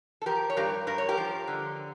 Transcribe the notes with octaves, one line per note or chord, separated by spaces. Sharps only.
A4
F3 G4 A#4
C#5
G2 G4 A#4
G2 A#4
C#5
G4 A#4
F3
D3